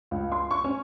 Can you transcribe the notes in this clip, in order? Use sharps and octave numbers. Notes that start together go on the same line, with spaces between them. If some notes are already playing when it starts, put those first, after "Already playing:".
C#2
C6
C#6
C#4